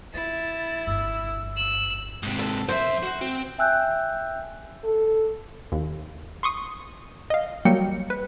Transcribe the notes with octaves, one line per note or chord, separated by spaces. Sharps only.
E4 F4 A6
G1 G2 E6
E6 F#7
G#2 C3
A4
F#2 C5 E5
F#4
C4
E5 G5 G#5 E6 F#6 G6
A4
D#2
C6 C#6 D#6
D#5 F5
F#3 G3 A#3 G5 C#7
B4